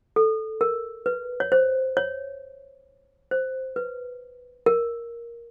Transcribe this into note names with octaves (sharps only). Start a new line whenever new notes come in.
A4
A#4
B4
C#5
C5
C#5
C5
B4
A#4